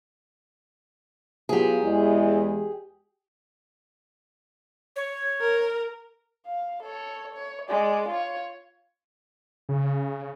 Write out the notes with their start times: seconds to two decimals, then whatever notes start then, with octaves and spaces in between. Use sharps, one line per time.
1.49 F#3 B3 F4 G4 G#4
1.83 E2 E3 G#3
4.96 C#5
5.40 A#4
6.46 F5
6.82 A4 C#5
7.34 C#5
7.69 G#3 D5
8.08 F4 C#5
9.69 C#3